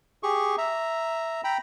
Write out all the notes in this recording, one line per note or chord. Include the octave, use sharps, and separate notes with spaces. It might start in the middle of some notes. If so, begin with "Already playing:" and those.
G4 G#4 C#6
E5 A#5
G5 A#5 B5